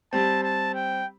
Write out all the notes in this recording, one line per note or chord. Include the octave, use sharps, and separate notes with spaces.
G3 C4 A5
A5
G5